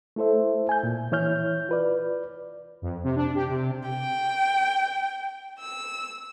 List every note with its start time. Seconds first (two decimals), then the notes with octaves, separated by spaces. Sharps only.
0.16 A3 E4 A4 C5 E5
0.69 G#5 G6
0.83 A#2
1.12 E3 E4 C#5 F6 G6
1.69 F4 B4 D5
2.82 F2
3.04 C3
3.16 D4
3.35 G4
3.48 C3
3.89 G5
5.59 E6